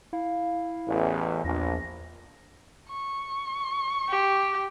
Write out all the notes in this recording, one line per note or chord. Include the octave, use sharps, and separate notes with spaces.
E4 F5
A1 E2
A#1 E2 A#6
C#6
G4